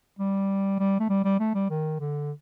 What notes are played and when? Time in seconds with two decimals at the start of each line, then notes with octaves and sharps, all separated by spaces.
0.19 G3
0.80 G3
1.00 A3
1.10 G3
1.25 G3
1.40 A3
1.55 G3
1.71 D#3
2.00 D3